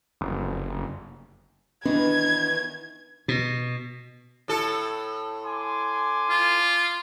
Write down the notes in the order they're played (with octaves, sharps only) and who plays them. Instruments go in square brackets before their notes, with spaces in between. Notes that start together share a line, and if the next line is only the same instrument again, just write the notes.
[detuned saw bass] F#1
[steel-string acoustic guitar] D#3 E3 B3 [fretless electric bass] C#4 D4 [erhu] G#6
[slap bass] B2
[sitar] A2 A4
[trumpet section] G#5 C6 D6
[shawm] F4